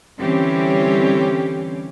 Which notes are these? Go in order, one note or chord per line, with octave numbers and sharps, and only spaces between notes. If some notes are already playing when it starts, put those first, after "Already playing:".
D3 E3 G3 C4 C#4 G4